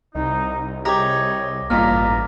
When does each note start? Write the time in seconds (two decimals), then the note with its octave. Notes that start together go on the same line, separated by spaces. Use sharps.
0.15 C2 D#4
0.85 D#4 G4 G#4 C#5 G5 A#5 D6 A#6
1.70 A1 G2 A#2 D#4 F4 A#5 F6 B6